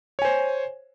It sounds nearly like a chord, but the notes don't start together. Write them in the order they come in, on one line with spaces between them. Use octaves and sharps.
C#5 G#5 C5